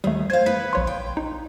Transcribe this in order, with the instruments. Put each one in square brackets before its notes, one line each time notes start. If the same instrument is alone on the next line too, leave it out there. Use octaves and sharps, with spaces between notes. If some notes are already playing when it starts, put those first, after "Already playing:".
[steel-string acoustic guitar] D#2 [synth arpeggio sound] G3 A3
[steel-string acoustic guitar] C5 F5 [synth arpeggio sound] G#6 D#7
[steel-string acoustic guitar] B3 B4 [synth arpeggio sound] B6
[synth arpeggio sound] A#1 C#5 C6
[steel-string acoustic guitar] G5
[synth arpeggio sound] D#4